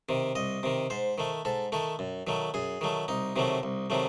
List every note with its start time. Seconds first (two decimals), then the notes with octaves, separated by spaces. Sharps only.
0.09 C3 D#3
0.35 C2 D#5
0.63 C3 D#3
0.90 G#2 C5
1.18 D#3 A3
1.45 G#2 A4
1.72 D#3 A3 A4
1.99 F#2
2.27 D#3 F#3 A3
2.54 F#2 G#4
2.81 D#3 F#3 A3
3.08 C2 D#4
3.36 C3 D#3 F#3 A3
3.63 C2
3.90 C3 D#3 F#3 A3